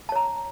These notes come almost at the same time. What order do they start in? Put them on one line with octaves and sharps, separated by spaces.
A5 C#5 A#5